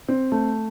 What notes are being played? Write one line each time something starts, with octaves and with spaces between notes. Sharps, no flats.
C4
A3